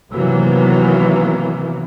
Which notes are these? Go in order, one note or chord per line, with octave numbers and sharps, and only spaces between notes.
C3 D#3 E3 F#3 A#3 B3